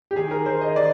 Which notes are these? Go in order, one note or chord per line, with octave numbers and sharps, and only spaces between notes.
G4
D#3 G#4
A#4
D#3 C5
D#5
D#3 D5